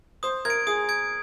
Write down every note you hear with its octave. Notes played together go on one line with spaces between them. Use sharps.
C5 D#6
A#4 G#6
D7
G#4 D#6
G#6 D7